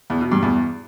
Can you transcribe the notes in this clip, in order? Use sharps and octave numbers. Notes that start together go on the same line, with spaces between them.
E2
B2
G2
E2